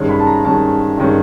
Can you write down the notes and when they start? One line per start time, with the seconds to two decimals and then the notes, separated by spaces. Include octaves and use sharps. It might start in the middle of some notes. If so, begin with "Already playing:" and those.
Already playing: G2 D#3 G#3 C#4
0.09 B5
0.19 A5
0.27 A#5
0.45 G2 D#3 G#3 C#4 A5
0.97 G2 D#3 G#3 C#4